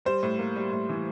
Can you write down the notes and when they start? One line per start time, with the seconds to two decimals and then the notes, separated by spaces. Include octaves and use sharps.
0.05 G3 C5
0.23 A2
0.39 A#3
0.56 G3
0.72 A2
0.89 E3